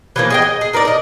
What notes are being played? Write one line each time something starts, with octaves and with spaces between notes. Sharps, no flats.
E3 F3 A#3
G#4 D#5 G5
D#5
G#4
D#4 A#4 B4 D5
A#4 D#5